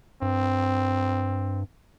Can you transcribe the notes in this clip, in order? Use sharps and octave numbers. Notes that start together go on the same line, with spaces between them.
G2 C4